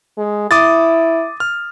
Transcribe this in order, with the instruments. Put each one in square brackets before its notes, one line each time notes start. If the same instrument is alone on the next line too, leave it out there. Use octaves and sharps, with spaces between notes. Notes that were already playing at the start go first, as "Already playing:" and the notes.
[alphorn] G#3
[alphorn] E4 [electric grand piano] D6 D#6 A6
[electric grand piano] F6